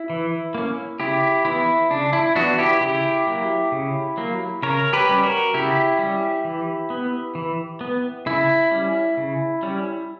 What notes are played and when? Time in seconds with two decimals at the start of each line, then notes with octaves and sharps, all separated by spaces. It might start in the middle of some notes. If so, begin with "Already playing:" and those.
Already playing: E4
0.10 E3
0.55 A#3 C#4
1.00 C#3 E4 G4
1.45 E3 B3 E4
1.90 C#3 D4
2.13 E4
2.36 E3 B3 D4 F#4
2.58 E4 G4
2.81 C#3 E4 G4
3.27 F#3 A#3
3.72 C#3
4.17 F#3 A#3
4.63 C#3 A#4 C#5
4.93 G4 B4
5.09 G3 C#4
5.23 F#4 A#4
5.54 C#3 E4 G4
5.99 G3 C#4
6.45 E3
6.90 B3
7.35 E3
7.81 B3
8.26 C#3 E4
8.71 G3 C#4
9.17 C#3
9.63 G3 C#4